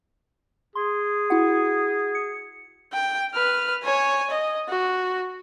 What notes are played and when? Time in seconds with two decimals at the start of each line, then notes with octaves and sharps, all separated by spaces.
0.75 G#4 C6
1.30 E4 F#4 F#5
2.15 C#7
2.93 G5
3.34 B4 F6
3.84 C#5 G#5
4.30 D#5
4.69 F#4